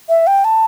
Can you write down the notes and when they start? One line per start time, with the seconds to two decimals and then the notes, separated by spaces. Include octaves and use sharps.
0.09 E5
0.27 G5
0.44 A5